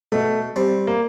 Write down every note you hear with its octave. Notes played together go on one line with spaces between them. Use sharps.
B2 A3
G3 C4
A#3